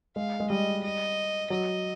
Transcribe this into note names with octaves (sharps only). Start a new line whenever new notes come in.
G#3 F5
G#3
G3 D#5
D#5
F#3 D#5